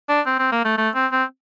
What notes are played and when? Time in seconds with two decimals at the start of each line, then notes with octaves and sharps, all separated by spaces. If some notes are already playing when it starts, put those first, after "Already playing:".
0.09 D4
0.26 C4
0.39 C4
0.52 A#3
0.65 A3
0.78 A3
0.95 C4
1.12 C4